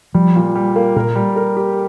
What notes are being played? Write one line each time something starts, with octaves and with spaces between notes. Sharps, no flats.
F3 G3
A#2
G3
A#3
A#2 A#4
G3
A#4
G4